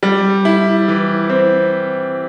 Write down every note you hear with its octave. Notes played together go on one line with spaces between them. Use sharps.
G3
E4
E3
C4